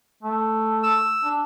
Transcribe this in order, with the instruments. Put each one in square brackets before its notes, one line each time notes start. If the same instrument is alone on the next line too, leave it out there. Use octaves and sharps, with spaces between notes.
[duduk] A3
[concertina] E6
[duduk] D4